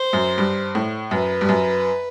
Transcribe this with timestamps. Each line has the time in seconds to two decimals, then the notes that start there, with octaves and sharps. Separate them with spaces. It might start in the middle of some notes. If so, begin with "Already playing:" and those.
Already playing: C5
0.13 F#2
0.38 G2
0.75 A2
1.11 F#2 B4
1.41 G2
1.49 F#2